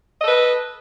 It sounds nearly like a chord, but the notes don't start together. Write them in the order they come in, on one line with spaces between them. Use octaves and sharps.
D#5 A4 B4